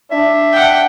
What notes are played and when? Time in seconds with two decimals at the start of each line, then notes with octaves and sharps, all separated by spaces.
0.11 D4 E5
0.52 F#5 G5